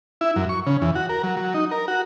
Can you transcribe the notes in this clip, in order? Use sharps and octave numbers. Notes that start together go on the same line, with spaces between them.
E4
F#2
C#6
C#3
E2
F#4
A#4
F#3
F#3
D#4
A#4
F#4